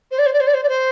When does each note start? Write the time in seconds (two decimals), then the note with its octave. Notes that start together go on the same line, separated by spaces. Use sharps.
0.11 C5
0.18 D5
0.26 C5
0.33 D5
0.40 C5
0.47 D5
0.54 C5
0.63 D5
0.68 C5